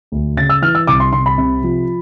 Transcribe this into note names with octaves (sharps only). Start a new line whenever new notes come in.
D2
C#3 A6
E6
E3 F6
E6
C2 D6
C6
C2 C6
B5
C3
F3